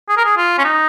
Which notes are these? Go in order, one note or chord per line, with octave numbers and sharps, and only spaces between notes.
G#4
A#4
G#4
F4
C#4
D#4